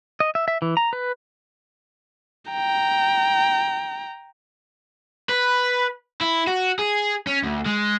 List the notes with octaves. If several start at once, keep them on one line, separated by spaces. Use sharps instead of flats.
D#5
E5
E5
E3
A#5
B4
G5 A#5
B4
E4
F#4
G#4
C#4
D2
G#3